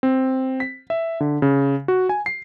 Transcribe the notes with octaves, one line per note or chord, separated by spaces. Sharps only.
C4
B6
E5
D3
C#3
F#4
G#5
C7